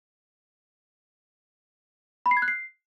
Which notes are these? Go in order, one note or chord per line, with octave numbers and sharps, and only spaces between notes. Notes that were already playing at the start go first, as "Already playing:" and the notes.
B5
C7
G#6
F#6
C7